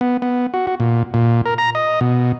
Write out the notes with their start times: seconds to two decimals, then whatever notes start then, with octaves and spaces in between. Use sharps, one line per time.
0.01 B3
0.22 B3
0.54 F#4
0.67 F#4
0.80 A#2
1.14 A#2
1.46 A#4
1.58 A#5
1.75 D#5
2.01 B2